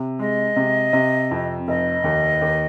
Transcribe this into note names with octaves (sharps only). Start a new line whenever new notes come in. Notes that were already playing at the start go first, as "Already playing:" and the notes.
Already playing: C3
G#3 D#5
C3
C3
F2
F1 D#5
D#2
D#2